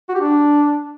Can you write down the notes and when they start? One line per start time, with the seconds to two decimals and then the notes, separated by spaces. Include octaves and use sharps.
0.09 F#4
0.15 G4
0.20 D4